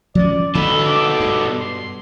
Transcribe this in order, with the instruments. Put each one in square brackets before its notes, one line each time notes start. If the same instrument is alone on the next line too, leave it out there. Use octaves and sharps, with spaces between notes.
[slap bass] F3 C#4 [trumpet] D5
[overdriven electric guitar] B2 A4 [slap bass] D3 [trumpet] B5
[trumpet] D6
[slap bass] G2
[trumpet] C6